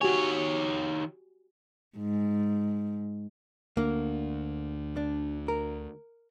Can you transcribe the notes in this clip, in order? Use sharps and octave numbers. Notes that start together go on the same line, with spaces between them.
D#3 F#4 G4 C#5 G#5
G#2
D2 D3 A#3
D4
A#4